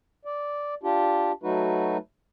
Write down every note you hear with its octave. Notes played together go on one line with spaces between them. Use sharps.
D5
D4 F4 G4
F#3 A3 D#4 F#4 B4